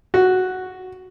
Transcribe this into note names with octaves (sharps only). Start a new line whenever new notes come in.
F#4